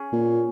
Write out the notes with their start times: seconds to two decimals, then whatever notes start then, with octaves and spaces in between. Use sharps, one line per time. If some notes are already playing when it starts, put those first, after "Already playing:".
Already playing: C#4 G#4
0.13 A#2